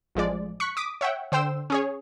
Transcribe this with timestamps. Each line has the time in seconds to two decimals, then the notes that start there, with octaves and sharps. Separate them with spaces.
0.15 A1 F3 G#3 D5
0.60 C#6 F#6 B6 C#7
0.77 D6 D#6 B6
1.01 C#5 E5 F#5 G5
1.32 D3 C5 G5 E6 E7
1.70 C#4 G#4 C#5